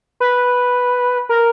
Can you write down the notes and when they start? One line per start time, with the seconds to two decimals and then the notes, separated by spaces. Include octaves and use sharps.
0.20 B4
1.29 A#4